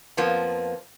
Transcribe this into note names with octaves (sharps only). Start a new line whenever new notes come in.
F2 F3 A#3 B3